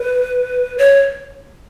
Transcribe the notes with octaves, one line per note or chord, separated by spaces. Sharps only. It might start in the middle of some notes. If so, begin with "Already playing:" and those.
Already playing: B4
C#5